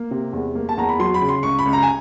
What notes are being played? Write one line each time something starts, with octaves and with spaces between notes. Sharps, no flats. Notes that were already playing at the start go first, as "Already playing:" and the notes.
Already playing: A#3
C3
E2
A#3
A5
E2 A#5
B5
F#3 C6
B5
C#3
C6
C#2 C#6
B5
C#2
A#5
G#5